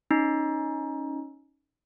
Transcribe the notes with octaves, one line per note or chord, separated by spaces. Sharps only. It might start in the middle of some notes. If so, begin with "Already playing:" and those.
C#4 D#4